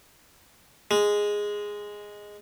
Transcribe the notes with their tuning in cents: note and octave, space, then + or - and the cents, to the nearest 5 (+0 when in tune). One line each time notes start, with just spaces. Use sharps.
G#3 -5